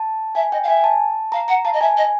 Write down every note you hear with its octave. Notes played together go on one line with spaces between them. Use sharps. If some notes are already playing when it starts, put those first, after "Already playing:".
Already playing: A5
E5 G#5
D#5 G5
F5
E5 G#5
A5
F5 A#5
F#5 A#5
F5 A5
D#5
E5 G#5
D#5